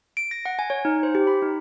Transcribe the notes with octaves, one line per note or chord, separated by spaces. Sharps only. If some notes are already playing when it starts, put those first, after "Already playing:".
D7
A#6
F#5
G#5
C#5
D#4
C5
G4
B5
D#4